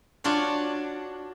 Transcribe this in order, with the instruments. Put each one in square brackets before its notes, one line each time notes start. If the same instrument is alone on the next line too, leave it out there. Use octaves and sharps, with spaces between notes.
[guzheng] D4 F4 F#4 C#5